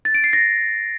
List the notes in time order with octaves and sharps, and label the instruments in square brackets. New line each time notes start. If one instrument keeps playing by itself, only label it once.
[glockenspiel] A6
D7
C7
A#6